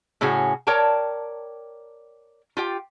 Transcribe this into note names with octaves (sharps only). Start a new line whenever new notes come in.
A2 C#3 C#4 F#4 G#4
A#4 C#5 D5 G5 A5
F4 G4 G5